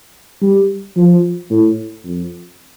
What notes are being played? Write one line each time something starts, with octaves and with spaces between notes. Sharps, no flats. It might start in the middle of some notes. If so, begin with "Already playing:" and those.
G3
F3
A2
F2